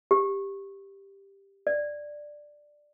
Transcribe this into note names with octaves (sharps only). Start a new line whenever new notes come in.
G4
D5